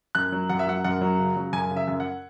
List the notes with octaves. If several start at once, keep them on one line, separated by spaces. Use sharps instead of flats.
F#2 F#6
F#3
F#2 F#5
E5
F#3 F#5
F#2 F#5
F#3
C#3
F#3
F#2 G#5
C#3
E5
F#2
F#5